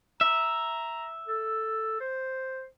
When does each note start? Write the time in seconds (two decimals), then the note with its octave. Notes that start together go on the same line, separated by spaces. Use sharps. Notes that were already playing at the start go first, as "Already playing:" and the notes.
0.21 E5 A#5
1.27 A4
2.00 C5